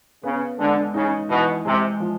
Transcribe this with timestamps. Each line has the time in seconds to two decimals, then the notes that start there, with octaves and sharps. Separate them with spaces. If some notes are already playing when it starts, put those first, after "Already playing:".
0.23 C#3 B3
0.59 D3 G#3
0.94 C#3 D#4
1.29 B2 E3
1.65 C3 G#3
2.00 F3